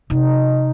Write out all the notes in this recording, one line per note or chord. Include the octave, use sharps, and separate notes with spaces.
C3 D#4